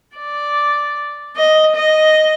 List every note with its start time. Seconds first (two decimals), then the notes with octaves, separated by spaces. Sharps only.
0.16 D5
1.36 D#5
1.75 D#5